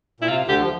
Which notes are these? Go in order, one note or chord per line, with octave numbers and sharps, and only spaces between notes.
A#2 E4
C3 F4
D2 D3 G4
F3